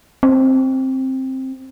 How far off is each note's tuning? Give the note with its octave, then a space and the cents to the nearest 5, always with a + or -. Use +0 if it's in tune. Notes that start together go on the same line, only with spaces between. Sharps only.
C4 +10